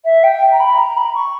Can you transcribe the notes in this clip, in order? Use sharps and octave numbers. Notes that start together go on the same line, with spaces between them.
E5
G5
A#5
B5
A#5
B5
C#6